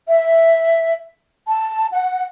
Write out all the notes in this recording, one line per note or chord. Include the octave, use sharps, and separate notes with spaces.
E5
A5
F#5